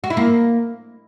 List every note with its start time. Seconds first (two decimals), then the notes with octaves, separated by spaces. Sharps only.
0.04 F#4
0.10 E4
0.17 A#3